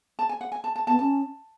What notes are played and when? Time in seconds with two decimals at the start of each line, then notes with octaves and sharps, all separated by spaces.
0.19 A5
0.29 G#5
0.41 F#5
0.52 G#5
0.64 A5
0.76 A5
0.87 B3 A5
0.99 C#4 A5